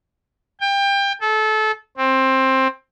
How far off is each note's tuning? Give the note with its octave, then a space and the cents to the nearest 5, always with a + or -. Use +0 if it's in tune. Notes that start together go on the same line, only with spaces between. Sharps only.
G5 +25
A4 -25
C4 +15